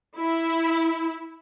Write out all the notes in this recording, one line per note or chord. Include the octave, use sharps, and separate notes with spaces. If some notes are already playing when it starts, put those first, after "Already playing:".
E4